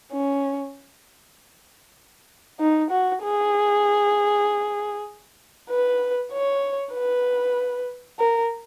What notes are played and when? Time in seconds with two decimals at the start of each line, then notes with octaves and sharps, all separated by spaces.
0.12 C#4
2.60 D#4
2.90 F#4
3.22 G#4
5.70 B4
6.32 C#5
6.94 B4
8.19 A#4